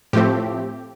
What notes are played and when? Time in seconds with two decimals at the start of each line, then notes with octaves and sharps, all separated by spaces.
0.13 A2 F3 A3 C4 G4